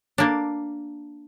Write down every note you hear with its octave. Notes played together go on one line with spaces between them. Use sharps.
A#3 D4